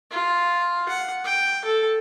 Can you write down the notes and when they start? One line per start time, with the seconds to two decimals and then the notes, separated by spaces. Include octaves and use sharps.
0.11 F4
0.89 F#5
1.24 G5
1.65 A4